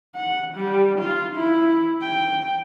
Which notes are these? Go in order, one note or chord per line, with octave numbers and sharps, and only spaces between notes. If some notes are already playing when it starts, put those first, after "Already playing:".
F#5
G3
F4
E4
G5